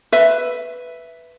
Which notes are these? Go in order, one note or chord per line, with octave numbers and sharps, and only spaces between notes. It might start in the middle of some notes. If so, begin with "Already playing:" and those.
B4 E5